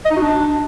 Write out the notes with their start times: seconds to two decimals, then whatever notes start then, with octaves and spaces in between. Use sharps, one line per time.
0.05 D#5
0.11 D#4
0.16 F#4
0.22 D4